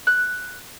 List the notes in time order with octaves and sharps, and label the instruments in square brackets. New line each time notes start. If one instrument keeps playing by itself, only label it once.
[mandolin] F#6